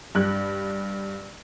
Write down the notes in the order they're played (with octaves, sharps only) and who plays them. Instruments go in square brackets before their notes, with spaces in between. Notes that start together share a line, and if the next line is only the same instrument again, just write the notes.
[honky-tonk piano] G2 F#6